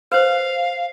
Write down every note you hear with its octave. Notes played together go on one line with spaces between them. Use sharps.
B4 C5 F5